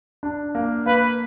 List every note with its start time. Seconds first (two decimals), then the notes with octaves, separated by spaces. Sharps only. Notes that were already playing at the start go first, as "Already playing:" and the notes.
0.23 D4
0.55 A#3
0.86 A#3 B4